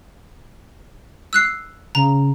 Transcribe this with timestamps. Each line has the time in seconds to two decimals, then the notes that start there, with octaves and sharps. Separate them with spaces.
1.33 E6 F#6 C7
1.95 C#3 A#5